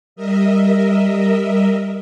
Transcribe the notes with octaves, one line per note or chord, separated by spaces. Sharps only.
G3 A#4 D#5 E5